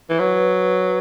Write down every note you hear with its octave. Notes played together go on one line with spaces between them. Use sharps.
E3
F#3 B4